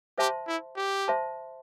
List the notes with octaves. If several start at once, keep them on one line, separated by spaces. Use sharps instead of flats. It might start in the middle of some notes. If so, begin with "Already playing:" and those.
G4 C5 E5 A5 C6
E4
G4
C5 E5 A5 C6